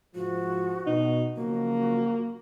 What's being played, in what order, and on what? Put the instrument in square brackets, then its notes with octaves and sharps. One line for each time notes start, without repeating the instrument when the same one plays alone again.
[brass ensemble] G#2 C3 F3 [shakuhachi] F#4
[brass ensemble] B2 [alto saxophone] D#4
[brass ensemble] C#3 F3 F#3 [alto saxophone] A#3 [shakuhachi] F#4